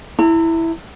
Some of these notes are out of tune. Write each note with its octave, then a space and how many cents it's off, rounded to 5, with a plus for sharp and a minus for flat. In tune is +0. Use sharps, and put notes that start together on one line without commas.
E4 +0 A#5 -40